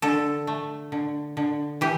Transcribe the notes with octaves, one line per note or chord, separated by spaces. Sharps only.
D3 A4
A3
D3
D3
E3 G4